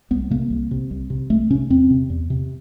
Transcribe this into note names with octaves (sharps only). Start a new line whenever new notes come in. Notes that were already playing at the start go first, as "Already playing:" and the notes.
C2 B3
C3 A#3
C2
C3
C2
C3
C2 A3
C3 C#4
E2 C4
C3
E2
C3